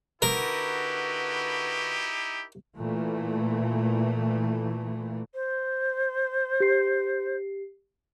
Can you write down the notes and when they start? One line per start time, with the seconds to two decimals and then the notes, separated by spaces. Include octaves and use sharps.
0.22 D3 D#4 E4 F#4 G4 A#4 B4
2.76 A#2 E3 A3
5.33 C5
6.60 G4 C7